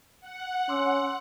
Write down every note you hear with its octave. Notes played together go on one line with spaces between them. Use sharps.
F#5
C#4 C6 D6 E6